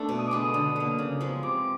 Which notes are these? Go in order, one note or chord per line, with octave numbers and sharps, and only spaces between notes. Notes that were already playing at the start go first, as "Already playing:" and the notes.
Already playing: A3 B3 D4
B2
D#6
D6
G#3 B3 D4 D#6
D3
F#3 A#3
C#3
F3 G#3 B3
C3 D6